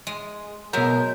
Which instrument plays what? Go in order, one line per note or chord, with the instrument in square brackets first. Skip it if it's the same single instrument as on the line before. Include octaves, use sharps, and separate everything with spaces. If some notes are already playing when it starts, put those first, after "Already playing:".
[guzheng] G#3
[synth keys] B2 A#4 [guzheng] F#3 G#3 E5 [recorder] G6